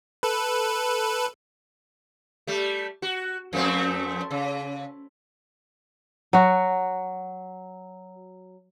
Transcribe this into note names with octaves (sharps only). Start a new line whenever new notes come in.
A4 B4
G3 A3
F#4
F2 A3 C4
C#3
F#3 F#4